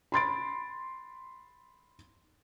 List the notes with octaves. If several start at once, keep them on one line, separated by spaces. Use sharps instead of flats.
B5 C6 A6 D7